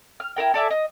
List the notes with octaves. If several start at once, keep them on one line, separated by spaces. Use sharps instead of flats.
F6
E4 F4 A#4 G5
A4 D5 E5 G#5
D#5